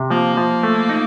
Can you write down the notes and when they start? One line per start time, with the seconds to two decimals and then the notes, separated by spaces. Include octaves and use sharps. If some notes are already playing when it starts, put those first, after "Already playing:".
Already playing: C3
0.10 F3 A#3
0.37 F3
0.63 A3
0.89 D#4